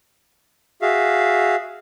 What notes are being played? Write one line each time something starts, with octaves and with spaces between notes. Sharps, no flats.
F#4 G#4 E5 F5